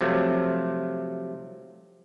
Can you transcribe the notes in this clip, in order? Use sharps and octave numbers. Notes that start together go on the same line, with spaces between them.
C3 F3 F#3 A3